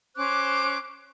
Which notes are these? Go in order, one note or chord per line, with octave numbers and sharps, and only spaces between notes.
C#4 C5 D6 F#6